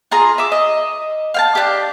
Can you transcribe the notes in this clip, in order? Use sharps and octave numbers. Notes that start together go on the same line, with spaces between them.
F4 G#4 A#5
E5 D6
D#5
F5 G5 A5
D4 G4